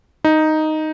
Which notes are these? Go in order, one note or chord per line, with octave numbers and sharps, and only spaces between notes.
D#4